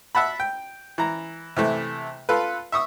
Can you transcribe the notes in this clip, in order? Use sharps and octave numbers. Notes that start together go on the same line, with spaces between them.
E5 F#5 A5 B5
G5
E3 A#5
C3 E3 A3
F4 A4 B4
E5 C#6 D#6 E6